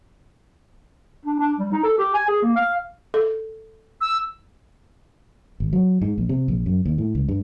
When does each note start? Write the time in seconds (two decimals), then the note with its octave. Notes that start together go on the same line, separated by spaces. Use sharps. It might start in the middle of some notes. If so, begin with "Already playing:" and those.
1.25 D4
1.39 D4
1.59 G3
1.72 D#4
1.84 A4
1.98 G4
2.14 G#5
2.28 G#4
2.42 A#3
2.56 F5
3.14 A4
4.01 E6
5.60 G#1
5.73 F#3
6.02 G#2
6.18 A#1
6.29 C3
6.48 A#1
6.66 F#2
6.85 D#2
6.98 A2
7.15 C#2
7.29 G2